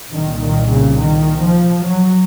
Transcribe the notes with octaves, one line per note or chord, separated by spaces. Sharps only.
C2 A#2 D#3
D#3
C#3
D#3
F3
F#3